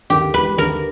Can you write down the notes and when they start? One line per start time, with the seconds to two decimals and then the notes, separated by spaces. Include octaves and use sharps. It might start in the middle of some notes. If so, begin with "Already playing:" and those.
0.10 D#2 D3 G4
0.34 E1 B4
0.58 D#2 D3 A#4